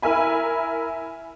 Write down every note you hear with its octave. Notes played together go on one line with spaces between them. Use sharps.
E4 A#4 E5 G#5 B5